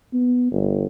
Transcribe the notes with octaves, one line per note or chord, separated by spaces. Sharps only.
B3
G1